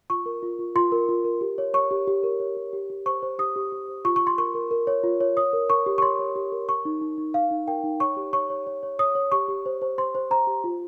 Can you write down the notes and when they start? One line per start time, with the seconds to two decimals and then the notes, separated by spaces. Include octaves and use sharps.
0.10 F4 C#6
0.26 A#4
0.42 F4
0.59 F4
0.76 F4 C6
0.92 A#4
1.09 F4
1.25 A#4
1.41 G4
1.58 C#5
1.74 C#5 C#6
1.91 G4
2.07 G4
2.23 A#4
2.40 C#5
2.57 G4
2.73 G4
2.90 G4
3.06 C5 C#6
3.22 C5
3.39 G4 D#6
3.56 G4
3.72 G4
3.89 C5
4.05 F4 C#6
4.16 C#6
4.22 F4
4.27 C6
4.38 A#4 C#6
4.55 A#4
4.71 A#4
4.87 C#5
5.04 F4
5.21 C#5
5.37 C#5 D#6
5.53 A#4
5.70 A#4 C#6
5.86 G4
5.98 C#6
6.02 C#5 C6
6.19 C#5
6.36 G4
6.52 A#4
6.68 A#4 C#6
6.85 D#4
7.01 D#4
7.18 D#4
7.34 D#4 F5
7.51 D#4
7.67 A#4 G5
7.84 D#4
8.00 C#5 C#6
8.17 G4
8.33 C#5 C#6
8.50 C#5
8.67 C#5
8.83 C#5
8.99 C#5 D#6
9.15 C#5
9.32 G4 C#6
9.49 G4
9.66 C5
9.82 C5
9.98 C5 C6
10.15 C5
10.31 C5 A#5
10.47 G4
10.64 F4